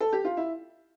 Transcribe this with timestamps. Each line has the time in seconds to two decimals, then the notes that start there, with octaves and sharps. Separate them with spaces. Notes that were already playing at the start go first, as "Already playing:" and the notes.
0.00 A4
0.13 G4
0.25 F4
0.37 E4